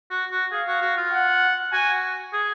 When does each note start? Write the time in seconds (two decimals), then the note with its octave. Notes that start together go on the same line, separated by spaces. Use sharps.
0.11 F#4
0.32 F#4
0.52 G#4 F5
0.67 F#4
0.82 F#4
0.97 F4
1.12 F#5
1.72 F#4 G#5
2.33 G#4